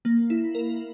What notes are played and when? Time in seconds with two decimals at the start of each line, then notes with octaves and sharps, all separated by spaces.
0.05 A#3
0.30 E4
0.55 A#4